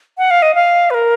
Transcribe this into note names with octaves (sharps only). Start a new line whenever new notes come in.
F#5
F5
D#5
F5
B4
A#4